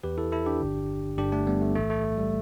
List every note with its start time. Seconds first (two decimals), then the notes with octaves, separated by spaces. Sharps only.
0.04 E2 E3 G4 B4
0.18 E4 A4
0.32 E4 A4
0.46 D4 G4
0.60 G1 G2 D3
1.18 G1 G2 D3 D4 G4
1.32 A3 D4
1.47 G3 B3
1.62 A3
1.75 B1 A2 E3 A3
1.90 A3
2.04 A3
2.18 G3